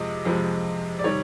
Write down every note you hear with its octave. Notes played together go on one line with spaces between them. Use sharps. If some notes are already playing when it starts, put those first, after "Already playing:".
Already playing: F2 C3 F3 G#3 D#5
F2 C3 F3 G#3
D5
C3 D#3 G3 C#5